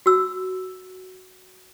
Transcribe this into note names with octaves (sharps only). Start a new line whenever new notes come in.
F#4 E6